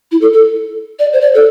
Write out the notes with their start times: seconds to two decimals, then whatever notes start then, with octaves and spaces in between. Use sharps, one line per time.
0.12 E4
0.21 A4
0.33 A4
0.99 D5
1.13 C5
1.21 D5
1.34 A4